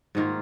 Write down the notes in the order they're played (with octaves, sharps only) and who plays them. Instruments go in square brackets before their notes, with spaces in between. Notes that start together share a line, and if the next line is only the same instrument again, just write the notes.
[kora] G#2 D#3 A#3 F4